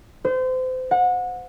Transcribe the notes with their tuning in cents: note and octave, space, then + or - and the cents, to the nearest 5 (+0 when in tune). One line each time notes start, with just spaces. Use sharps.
C5 -30
F#5 -30